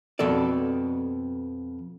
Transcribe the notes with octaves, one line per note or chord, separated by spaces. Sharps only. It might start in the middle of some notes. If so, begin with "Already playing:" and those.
F2 B2 B3 A4 D5